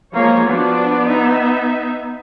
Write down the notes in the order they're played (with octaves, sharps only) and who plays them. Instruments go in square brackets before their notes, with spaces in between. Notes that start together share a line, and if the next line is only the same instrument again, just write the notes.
[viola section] F3 G#3 C#5 [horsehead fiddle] A#3
[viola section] F3 D4 F#4 [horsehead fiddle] B3
[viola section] D#4 E5